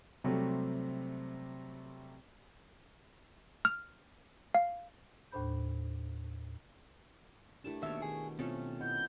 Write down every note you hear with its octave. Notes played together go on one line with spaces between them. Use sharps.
C3 F#3 G3 A3 C4
F6
F5
D#2 A2 D4 C5 B5 G6
A3 D4 E4 G4 A#4 A5
D#2 B2 D#3 C#5 E5
G#4
B2 A3 C4 C#4 F4 A4
B3 E4 D#5 G6